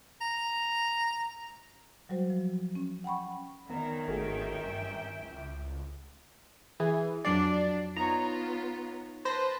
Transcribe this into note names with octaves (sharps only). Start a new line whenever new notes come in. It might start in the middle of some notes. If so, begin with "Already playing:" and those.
A#5
F#3 G3 F#4 C5
F3
C#4
F#5 G5 B5 C#6
D#3 B3 C#4 D5 E5 A#5
G#1 A3 F#4 G#4 E5 G5
G2 A#5
C#2
E3 G#4
F2 F#3 D4 D5 C7
B3 D#4 F4 C#5 A#5
B4 C5 A5 B5 A#6